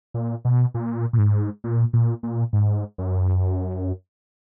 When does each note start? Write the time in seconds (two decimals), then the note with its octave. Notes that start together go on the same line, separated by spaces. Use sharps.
0.14 A#2
0.45 B2
0.74 A#2
1.13 A#2
1.18 G#2
1.64 A#2
1.93 A#2
2.23 A#2
2.53 G#2
2.98 F#2